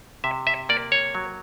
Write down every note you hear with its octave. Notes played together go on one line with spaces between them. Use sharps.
C3 E5
E5
A#3 D5
C#5
F#3